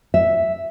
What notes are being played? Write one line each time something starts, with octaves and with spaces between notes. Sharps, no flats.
E5